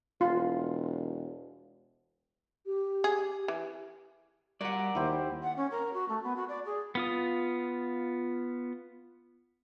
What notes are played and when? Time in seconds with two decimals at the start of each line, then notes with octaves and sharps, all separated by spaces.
0.21 E1 F4
2.66 G4
3.04 G#4
3.48 E3
4.61 G3 F#4 A#4 D5 F#5
4.95 D#2 E4 G4 C5
5.43 F#5
5.56 C#4
5.71 A#4
5.93 F#4
6.09 A3
6.23 B3
6.36 F#4
6.49 D5
6.66 G#4
6.95 B3 F4 D#6